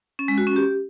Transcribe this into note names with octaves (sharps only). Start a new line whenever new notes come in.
C#4
G#3
F#4
C#4
G4